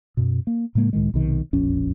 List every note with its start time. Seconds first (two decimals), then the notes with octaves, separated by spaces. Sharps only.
0.17 F#2 B2
0.47 A#3
0.75 A2 C#3 G#3 A#3
0.93 C#2 A2 D#3 G#3
1.14 B1 C3 D#3
1.53 E1 A#1 F2 C#4